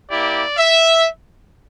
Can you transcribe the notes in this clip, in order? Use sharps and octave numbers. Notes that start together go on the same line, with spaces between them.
A#3 E4 G4 D5
E5